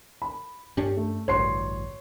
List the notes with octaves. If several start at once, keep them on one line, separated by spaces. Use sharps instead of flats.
B5
G2 C#4 D4 G4
A3
A1 D2 G2 C#5 C6 C7